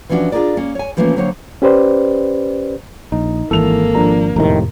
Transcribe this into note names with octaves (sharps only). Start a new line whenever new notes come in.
E3 F3 C#4 D4 F#4
D4 F4 G4 G#4 A#4 D5
A#3 C#4
C#5 G#5
D3 E3 F3 A3 A#3 C#4
D3 F#3 A#3 C4 C5 C#5
C#4 G4 B4 C5 D5
A#1 D#4
G#1 E3 A#3 A4 F7
F3 D4 A#5
E1 F2 A2 C3 D#3 A#5